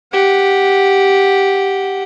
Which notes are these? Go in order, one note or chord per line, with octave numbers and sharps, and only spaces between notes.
G4 F#5